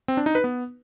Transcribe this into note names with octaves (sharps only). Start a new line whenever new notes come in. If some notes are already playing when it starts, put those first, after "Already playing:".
C4
D4
D#4
B4
B3